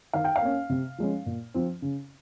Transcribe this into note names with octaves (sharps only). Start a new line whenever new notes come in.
D#3 F5
G5
F5
A#3 C#4
C3
F3 G#3 C#4
A#2
F3 C4
C#3